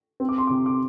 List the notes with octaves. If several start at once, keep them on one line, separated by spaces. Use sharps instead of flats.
C4
D6
C6
C3 D6
D6